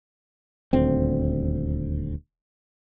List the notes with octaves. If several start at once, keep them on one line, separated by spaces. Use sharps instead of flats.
D#1 D2 C4